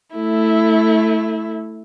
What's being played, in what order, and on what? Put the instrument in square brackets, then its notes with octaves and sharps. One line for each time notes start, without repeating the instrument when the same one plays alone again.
[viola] A3 E4